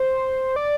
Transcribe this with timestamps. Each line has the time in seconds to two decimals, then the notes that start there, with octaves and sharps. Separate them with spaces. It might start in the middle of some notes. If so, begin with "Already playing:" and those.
Already playing: C5
0.56 D5